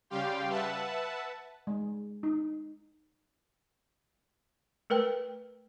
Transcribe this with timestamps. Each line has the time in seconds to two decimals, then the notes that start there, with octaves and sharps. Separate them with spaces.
0.10 C#3 G3 G4 F5 G5 C6
0.49 B4 E5 F#5 A5
1.67 G#3
2.23 D#4
4.90 A3 A#4 B4 G5